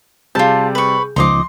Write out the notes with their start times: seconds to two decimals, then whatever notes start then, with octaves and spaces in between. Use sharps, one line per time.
0.35 C3 G3 F4 G#4 A5 G6
0.75 B4 C#6
1.16 C#2 F3 D#4 D#5 C6 D6 C7